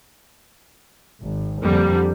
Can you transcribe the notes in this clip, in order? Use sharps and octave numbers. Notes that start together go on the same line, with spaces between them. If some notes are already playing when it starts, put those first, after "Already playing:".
G#1
F2 D3 G3 A#3